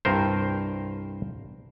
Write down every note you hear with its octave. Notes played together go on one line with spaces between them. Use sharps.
C2 G2 A#4 C5